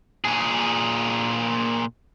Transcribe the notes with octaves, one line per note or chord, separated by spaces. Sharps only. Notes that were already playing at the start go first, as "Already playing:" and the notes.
A#2 G#4